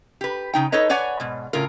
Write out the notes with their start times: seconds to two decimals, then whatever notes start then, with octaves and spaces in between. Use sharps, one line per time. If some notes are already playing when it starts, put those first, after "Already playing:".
0.21 G4 B4
0.54 C#3 D#4 G5
0.72 D#4 A4 B4 C#5 D#5
0.89 B4 C#5 D5 F#5 G#5
1.20 G#2 B2
1.53 A2 C#3 F4 A#4